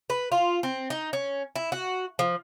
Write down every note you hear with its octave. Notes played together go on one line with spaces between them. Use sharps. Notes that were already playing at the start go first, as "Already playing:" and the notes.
B4
F4
C4
D#4
C#4
E4
F#4
F3